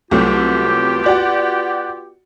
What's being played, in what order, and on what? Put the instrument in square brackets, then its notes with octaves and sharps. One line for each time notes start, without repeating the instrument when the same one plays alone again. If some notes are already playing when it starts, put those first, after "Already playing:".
[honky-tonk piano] C2 F#3 A3 [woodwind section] B3 F4 G4
[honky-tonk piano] F#4 D5 F#5